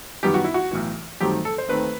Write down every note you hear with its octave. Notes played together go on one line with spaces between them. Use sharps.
F#2 D#3 G3 B3 G4
F#4
E4
F#4
B1 A2 E3
G2 D#3 F#3 A3 C4 G4
A4
C5
D#2 D#3 A3 C4 B4